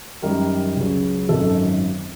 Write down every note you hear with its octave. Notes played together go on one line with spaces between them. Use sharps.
F#2 D#3 G3 A#4
C#2 C#3 F#3
G#1 F#2 D#3 F#3 A4